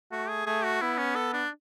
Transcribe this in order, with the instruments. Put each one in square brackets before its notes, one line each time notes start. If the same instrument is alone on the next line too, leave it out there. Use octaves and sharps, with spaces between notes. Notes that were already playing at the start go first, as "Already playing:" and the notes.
[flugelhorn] A3 [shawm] F#4
[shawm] G#4
[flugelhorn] A3 [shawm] G#4
[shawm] F#4
[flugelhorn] B3 [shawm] E4
[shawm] C#4
A4
D4